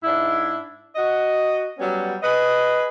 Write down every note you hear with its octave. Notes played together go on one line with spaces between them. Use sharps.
G#2 D4 E4
F#4 D#5
F#3 G3 B3 C#4
G#4 B4 D#5